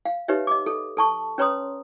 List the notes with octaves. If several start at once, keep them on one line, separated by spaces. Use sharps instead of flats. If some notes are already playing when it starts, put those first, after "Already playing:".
F5
D#4 G4 B4 C#5 E5
D#5 D6
A4
A4 A5 C#6
C#4 B4 C#5 A#5 C6 D#6